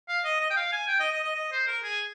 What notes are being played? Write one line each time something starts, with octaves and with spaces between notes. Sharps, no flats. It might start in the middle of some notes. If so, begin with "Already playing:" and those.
F5
D#5
D#5
G5
F5
G#5
G5
D#5
D#5
D#5
D#5
C5
A#4
G#4